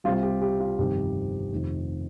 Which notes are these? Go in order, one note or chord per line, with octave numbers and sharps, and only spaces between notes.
C2 C3 G3 F4
G4
G4
F4
G1 F2 C3 D#3 G3 G4
F1 F2 D#3